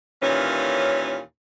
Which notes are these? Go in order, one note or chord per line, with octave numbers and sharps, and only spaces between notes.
D#2 A#2 E3 C#4